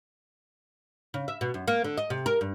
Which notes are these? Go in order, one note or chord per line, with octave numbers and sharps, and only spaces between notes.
C#3
E5
B2
F#2
A#3
D3
D#5
C3
A#4
G2